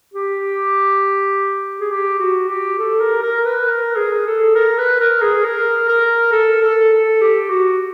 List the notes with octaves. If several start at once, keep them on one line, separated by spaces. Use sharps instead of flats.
G4
G#4
G4
F#4
G4
A4
A#4
A#4
B4
A#4
G#4
A4
A#4
B4
A#4
G#4
A#4
A#4
A4
A4
A4
G4
F#4